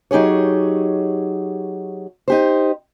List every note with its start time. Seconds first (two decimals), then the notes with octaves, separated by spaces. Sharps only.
0.11 F#3 D#4 G4 G#4 C#5
2.28 D#4 G4 C5